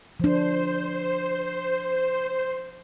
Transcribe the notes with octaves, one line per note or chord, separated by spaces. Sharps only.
F3 D4 C5